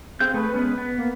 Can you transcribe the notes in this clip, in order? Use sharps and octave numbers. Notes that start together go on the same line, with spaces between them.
C4 G#4 F5 G6
A3 G#4 B4
G#3 B3 C#4 B4
B3
A#3